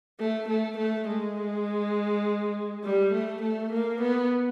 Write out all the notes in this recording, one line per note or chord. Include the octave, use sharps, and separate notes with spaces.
A3
A3
A3
G#3
G3
A3
A3
A#3
B3